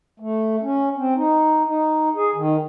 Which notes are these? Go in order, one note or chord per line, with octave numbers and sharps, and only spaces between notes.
A3
C#4
C4
D#4
D#4
G#4
D#3